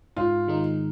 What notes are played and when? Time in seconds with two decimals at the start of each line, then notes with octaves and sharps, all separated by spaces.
0.17 G#2 F4
0.48 D#3 G#3 D#4